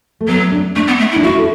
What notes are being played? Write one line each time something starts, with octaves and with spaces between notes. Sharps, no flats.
A3
F#3 B3
D4
A3 D4
B3
A3
E4
D4
E4 F#4
A4